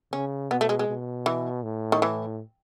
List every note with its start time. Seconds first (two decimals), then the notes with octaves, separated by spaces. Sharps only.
0.13 C#3 C#4
0.51 B2 B3
0.61 A3
0.69 G#3
0.79 G#3
0.88 B2
1.26 E3
1.63 A2
1.92 D#3
2.02 E3